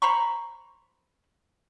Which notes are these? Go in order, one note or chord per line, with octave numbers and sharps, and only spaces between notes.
C5 A#5 B5 C#6